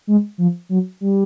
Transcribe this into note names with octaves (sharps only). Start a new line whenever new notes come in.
G#3
F3
F#3
G3